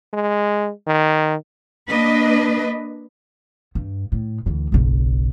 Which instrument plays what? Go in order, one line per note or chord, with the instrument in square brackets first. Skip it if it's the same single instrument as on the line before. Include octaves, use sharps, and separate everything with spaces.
[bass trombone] G#3
D#3
[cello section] A#3 D4 B4 D#5
[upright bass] G2
A2
D2 E3
F#1 B1